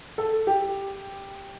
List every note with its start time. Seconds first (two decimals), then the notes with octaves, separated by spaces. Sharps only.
0.18 A4
0.47 G4